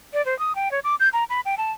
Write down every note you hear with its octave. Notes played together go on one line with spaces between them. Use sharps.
D5
C5
D#6
G5
C#5
D6
G6
A#5
B5
G5
A5